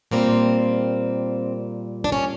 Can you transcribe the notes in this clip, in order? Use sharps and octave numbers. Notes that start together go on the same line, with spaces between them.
A#2 G3 A#3 C4
D4
C#4